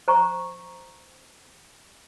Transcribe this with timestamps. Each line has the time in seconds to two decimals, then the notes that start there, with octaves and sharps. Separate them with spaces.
0.08 C5 A#5 C#6